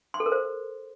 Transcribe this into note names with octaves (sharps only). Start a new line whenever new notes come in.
C6
A4
A#4
C5